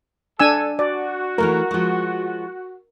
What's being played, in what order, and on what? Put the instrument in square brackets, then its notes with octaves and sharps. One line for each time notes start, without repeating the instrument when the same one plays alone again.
[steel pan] D4 G#5 E6 [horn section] A4
[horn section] F#4 [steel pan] D5
[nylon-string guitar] E3 F3 A3 [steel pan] A#4
[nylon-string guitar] F3 G#3